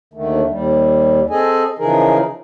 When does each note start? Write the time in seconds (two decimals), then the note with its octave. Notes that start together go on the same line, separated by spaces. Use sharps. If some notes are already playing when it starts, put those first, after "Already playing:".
0.14 D#2 D3 D#3 A3
0.48 D#2 G3
1.30 C4 G#4 A4 D#5 G#5
1.79 C#3 E3 F3 D#4 G#4 A#4